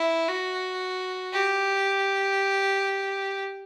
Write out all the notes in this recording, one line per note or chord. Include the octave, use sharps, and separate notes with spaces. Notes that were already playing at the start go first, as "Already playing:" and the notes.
Already playing: E4
F#4
G4